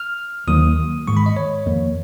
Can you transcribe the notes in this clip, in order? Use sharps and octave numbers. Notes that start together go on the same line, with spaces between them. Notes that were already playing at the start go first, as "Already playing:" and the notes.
Already playing: F6
D#2 D#3 F#3 A#3 D#6
G#2 D#3 G#3 C#6
B5
D#5
C#5
F2 D#3 A#3